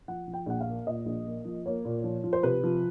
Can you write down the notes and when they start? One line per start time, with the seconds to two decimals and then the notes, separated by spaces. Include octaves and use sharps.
0.08 F3 F#5
0.28 F3
0.34 G5
0.46 A#1 F#5
0.61 F5
0.67 A#3
0.87 A#2 D#5
1.06 A#1
1.25 A#3
1.45 F3
1.66 A#3 C#5
1.85 A#2
2.04 F3
2.24 F3
2.33 C5
2.43 C3 B4
2.63 F3